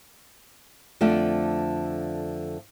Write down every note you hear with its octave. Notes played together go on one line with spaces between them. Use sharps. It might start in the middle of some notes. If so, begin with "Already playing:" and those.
F2 D3 A3 F4 D5